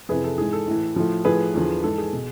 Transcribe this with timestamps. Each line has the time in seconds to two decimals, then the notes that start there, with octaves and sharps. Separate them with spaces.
0.09 F2 C3 E3 G#4 B4
0.24 A4
0.38 G#2 E3 G#4
0.53 A4
0.68 A2 E3
0.96 A2 F3
1.25 A2 F3 G#4 B4
1.54 E2 D3 F3
1.84 G#2 E3 A4
1.98 G#4
2.13 B2